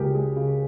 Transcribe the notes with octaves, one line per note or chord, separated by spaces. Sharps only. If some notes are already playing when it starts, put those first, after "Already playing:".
Already playing: C#2 C#3 G4 G#4 A#4
G#3 G#4
C#3